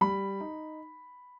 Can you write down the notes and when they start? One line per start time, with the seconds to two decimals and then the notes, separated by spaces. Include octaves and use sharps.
0.01 G3 B5
0.41 D#4